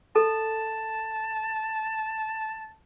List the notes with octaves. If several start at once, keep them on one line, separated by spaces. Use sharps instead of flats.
A4 A5